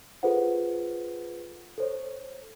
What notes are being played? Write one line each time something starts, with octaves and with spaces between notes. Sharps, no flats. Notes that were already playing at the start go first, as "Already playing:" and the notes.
F4 G#4 A4 B4 C5 F#5
A4 C5 C#5